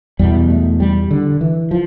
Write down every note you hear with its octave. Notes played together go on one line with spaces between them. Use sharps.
E2 B2 G3
A3
G3
D3
E3
F3